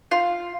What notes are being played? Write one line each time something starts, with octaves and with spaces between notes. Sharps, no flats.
F4